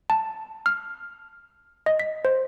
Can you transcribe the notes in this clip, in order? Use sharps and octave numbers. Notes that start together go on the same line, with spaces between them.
A5
F6
D#5
B6
C5